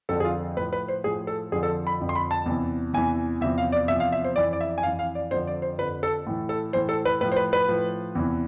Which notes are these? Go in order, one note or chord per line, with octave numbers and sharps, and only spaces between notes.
F2 D3 F3 A4
G#4
F4
A2 F3 B4
B4
C5
A2 F3 G#4
A4
F2 D3 F3 G#4
A4
B5
F2 D3 F3
C6
B5
A5
E2 C3 E3
E2 C3 E3 G#5
E2 C3 F3 E5
F5
D5
E2 C3 F3 E5
F5
E5
C5
F2 E3 D5
D5
E5
G#5
F2 E3 F5
F5
D5
F2 D3 F3 C5
D5
C5
F2 D3 F3 B4
A4
A2 E3
A4
A2 E3 C5
A4
B4
A2 F3 B4
C5
B4
B4
A2 F3
E2 C3 E3